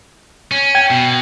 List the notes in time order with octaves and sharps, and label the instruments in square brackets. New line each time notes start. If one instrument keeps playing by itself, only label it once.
[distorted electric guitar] C#4
[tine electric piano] G5 G#6
[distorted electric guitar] B2